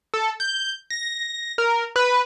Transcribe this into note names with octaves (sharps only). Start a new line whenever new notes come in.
A4
G6
A#6
A#4
B4